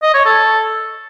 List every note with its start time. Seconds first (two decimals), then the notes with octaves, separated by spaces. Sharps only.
0.02 D#5
0.14 C#5
0.25 A4